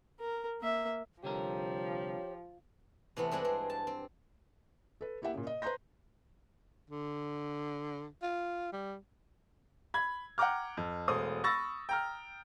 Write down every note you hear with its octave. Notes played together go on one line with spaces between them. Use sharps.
A#4
A#3 E5
C2 D3 F3 G4 A#4 C#5
C3 E3 A3 B3
G2 G#3 C4 D4 F#5
C4
A5
C4
A4 B4
A#3 E4 G4 E5 F#5
A#2 C#3
D#5
B4 C5 A#5 C6 G6 A#6
D3
F4
G3
B5 G#6
F#5 G5 A#5 D6 F6
F2
E1 A3 C5 D#6
B5 C#6 E6 A6 A#6
G5 A#5 F6